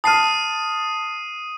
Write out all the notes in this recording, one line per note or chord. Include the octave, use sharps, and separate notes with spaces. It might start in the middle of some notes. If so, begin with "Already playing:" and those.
A5 D#6 F6 C7 D#7